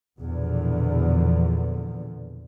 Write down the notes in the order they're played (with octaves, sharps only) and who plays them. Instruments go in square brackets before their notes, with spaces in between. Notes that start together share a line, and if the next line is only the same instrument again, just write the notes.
[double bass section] A#1 E2 B2 D3 F3